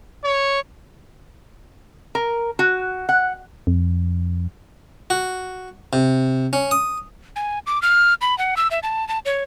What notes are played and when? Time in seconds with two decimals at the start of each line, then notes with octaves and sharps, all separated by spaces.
0.25 C#5
2.15 A#4
2.59 F#4
3.09 F#5
3.67 F2
5.10 F#4
5.93 C3
6.53 C#4
6.71 D#6
7.36 G#5
7.67 D6
7.82 F6
8.21 B5
8.38 F#5
8.57 E6
8.71 E5
8.83 A5
9.08 A5
9.26 C#5